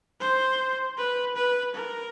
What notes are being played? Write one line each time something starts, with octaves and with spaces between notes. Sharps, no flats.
C5
B4
B4
A#4